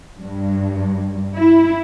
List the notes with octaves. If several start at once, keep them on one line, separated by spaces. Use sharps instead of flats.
G2
E4